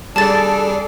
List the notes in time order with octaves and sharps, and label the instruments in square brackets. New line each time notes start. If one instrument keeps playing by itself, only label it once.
[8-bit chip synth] G3 G#4 [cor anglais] D4 [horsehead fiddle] A4 D5 [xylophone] A5 A6